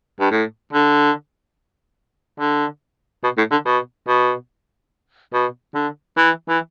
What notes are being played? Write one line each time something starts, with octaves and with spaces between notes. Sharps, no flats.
G2
A2
D3
D3
B2
A2
D3
B2
B2
B2
D3
E3
E3